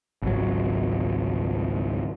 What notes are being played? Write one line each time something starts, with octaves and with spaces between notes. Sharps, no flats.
G#1 C#2 F#3